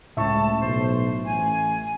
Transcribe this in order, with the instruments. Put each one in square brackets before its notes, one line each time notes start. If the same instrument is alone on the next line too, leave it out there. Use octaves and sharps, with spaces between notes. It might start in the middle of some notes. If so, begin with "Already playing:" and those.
[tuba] C#2 [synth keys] A2 [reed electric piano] E5 C#6 [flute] A5
[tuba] B1 [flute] C5
[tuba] A1 [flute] G#5